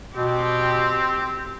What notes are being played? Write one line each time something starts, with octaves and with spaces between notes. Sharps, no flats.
B2 C4 G4